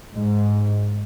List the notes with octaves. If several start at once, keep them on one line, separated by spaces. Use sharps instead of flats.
G#2